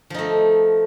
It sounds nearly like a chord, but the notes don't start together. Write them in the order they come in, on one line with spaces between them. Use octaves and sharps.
F3 D#4 A3